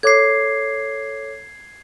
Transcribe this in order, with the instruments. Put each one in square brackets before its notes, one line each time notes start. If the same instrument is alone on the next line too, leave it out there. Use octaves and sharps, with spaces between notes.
[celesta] A4 C#5 D6 [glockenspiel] G#6 C7